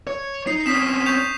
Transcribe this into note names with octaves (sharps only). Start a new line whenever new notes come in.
C#5
D#4 C7
C4 C#4 D#6 B6 E7
C#6 G6 F7